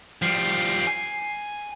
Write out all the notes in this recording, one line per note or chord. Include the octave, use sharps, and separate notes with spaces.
F3 G3 C7
G#5